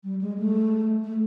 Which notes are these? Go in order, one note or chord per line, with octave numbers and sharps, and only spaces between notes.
G3
G#3
A3
A3